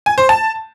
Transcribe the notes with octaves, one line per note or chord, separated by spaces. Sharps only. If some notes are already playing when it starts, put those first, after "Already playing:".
G#5
C5
A5